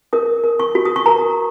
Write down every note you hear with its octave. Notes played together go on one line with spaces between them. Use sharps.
A#4 D#6
A#4
C#6
F#4
D#6
C#6
A#4 A#5